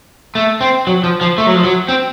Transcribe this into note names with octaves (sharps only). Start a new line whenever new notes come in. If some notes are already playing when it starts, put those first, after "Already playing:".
A3
C4
F#3
F3
F3
A3
F#3
F3
F#3
C4